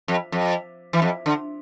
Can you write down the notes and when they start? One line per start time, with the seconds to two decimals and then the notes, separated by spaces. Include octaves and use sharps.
0.08 F2
0.32 F2
0.93 E3
1.02 F2
1.26 D3